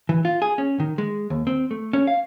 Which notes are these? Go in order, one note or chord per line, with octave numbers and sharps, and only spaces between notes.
E3
F4
G#4
C#4
D#3
G#3
D#2
C4
A3
C#4
F5